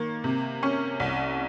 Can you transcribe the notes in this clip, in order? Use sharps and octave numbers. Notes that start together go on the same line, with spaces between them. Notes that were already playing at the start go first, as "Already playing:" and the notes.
Already playing: D#3 A#3
C3
C#4
C2